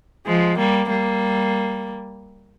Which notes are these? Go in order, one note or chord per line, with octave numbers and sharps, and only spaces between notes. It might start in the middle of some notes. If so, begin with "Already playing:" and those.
F3 G#3
G3 A#3
G3 A#3